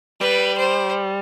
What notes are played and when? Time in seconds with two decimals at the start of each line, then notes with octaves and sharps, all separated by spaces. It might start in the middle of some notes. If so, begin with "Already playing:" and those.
0.20 G3 B4
0.57 C5